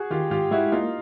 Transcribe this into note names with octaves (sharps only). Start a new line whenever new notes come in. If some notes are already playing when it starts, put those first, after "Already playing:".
Already playing: F#4 G#4
D#3 F4 G4
G#2 F4 G4
G#3 E4 F#4
A#3 D#4 F4